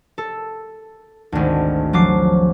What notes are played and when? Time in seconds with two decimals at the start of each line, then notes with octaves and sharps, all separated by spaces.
0.18 A4
1.32 G#1 D2
1.93 F3 F#3 D6 C7